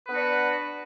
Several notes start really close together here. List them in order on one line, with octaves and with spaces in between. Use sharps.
B4 B3 D4 F#4 D5